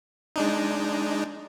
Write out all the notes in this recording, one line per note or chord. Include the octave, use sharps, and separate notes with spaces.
G#3 D4 D#4